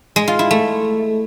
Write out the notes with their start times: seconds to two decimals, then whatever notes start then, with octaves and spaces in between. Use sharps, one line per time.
0.16 G#3
0.28 F4
0.39 E4
0.51 A3